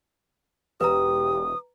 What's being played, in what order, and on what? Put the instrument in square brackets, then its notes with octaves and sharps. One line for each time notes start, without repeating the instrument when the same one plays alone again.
[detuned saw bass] E1 [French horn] G4 [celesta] B4 A#5 [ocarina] D#6